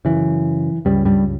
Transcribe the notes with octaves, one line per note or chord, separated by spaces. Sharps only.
F#2 C#3 E3
C#2 G2 C#3 G3
G2 G3